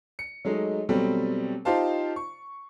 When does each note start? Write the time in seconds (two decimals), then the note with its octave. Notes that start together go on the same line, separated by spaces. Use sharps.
0.19 C#7
0.45 F#3 G#3 A3 D#4
0.89 B2 F#3 G3 A3 C4
1.65 D#4 F4 G4 C5 F5 A5
2.16 C#6